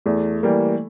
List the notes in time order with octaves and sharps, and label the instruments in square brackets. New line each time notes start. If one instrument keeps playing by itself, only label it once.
[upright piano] E2 [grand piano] A3
[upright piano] E3 G3 A#3